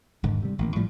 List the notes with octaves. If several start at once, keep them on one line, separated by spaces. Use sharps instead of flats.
E1 G#2 D3 D#3
C3 G3
A1 D#3 A#3
A2 F3 G3